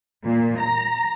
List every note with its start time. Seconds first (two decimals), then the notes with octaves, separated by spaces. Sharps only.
0.24 A#2
0.59 A#5